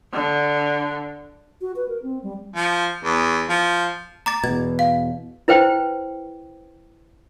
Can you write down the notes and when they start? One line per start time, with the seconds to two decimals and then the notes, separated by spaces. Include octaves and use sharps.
0.13 D3
1.61 F#4
1.76 B4
1.88 A#4
2.03 C4
2.24 G3
2.56 F3
3.04 E2
3.49 F3
4.26 A#5 D6 A6
4.44 E2 B2 G#6
4.79 F5
5.48 E4 B4 C5 G5